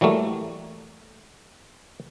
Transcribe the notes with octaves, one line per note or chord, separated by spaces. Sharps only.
E3 F#3 G3 A3 A#3